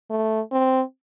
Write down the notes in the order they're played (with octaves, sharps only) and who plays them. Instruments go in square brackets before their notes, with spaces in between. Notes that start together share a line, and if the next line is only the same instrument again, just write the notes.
[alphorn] A3
C4